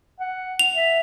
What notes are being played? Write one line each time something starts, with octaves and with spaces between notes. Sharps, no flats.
F#5
F7
E5